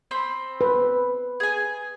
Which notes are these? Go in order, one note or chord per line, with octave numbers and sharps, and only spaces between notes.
C4 B5 C6
B4
G#4 G#5